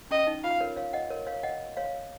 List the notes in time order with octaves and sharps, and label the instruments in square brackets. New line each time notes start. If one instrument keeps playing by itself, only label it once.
[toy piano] C#4 [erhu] D#5
[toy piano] D#4
[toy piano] F4 [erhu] F5
[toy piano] A#4 C#5
C#5 F5
D#5 F#5
A#4 C#5
C#5 F5
D#5 F#5
C#5 F5